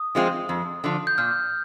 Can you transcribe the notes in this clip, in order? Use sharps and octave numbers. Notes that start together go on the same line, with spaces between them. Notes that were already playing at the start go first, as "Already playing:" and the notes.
Already playing: D#6
F3 G#3 C4 F4
F2
D3 F3
G6
A#2 F6